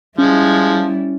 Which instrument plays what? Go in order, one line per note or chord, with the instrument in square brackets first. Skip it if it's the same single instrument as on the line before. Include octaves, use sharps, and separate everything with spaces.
[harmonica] F3 G#3 [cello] G3 E4 [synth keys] C#4